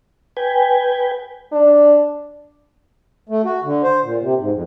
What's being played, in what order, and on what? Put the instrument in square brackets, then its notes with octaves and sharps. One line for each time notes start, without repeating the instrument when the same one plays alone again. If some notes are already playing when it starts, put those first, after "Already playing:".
[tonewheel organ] B4 G5 G#5
[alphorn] D4
[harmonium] A3
F#4
D3
C5
A#2
C3
G#2
F2